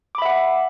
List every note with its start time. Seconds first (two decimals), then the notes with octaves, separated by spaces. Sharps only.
0.15 D6
0.18 B5
0.22 E5
0.25 F#5